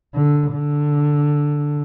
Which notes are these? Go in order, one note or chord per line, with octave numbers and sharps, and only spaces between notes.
D3
D3